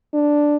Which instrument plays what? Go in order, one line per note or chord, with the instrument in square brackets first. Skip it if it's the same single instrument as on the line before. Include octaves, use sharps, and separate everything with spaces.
[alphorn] D4